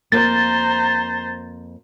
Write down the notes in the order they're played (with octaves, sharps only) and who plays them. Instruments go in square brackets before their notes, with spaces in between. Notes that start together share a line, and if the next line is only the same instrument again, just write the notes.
[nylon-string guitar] F2 G#2 A#3 [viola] C5 A#5 [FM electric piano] A6